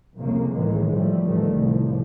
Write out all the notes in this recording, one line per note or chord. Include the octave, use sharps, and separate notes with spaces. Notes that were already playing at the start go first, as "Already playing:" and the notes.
C2 F2 C#3 A#3
C#2 A2 D#3 E3 G#3
A2 F3 G3 A3
A1 E2 D#3 G3 A3
C2 A2 F3